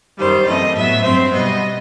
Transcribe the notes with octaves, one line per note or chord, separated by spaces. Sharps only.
F#2 D#3 G3 C5
F#2 E3 A3 C4 D#5
A2 F#3 B3 E5
G2 F#3 C4 C5
B2 G3 B3 D#5